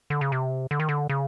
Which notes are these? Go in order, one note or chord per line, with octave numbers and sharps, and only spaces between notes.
D3
C#3
C3
D3
D#3
D3
C#3